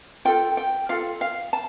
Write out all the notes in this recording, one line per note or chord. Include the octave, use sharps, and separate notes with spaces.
F4 A4 G5
G5
F4 A4 F5
F5
A5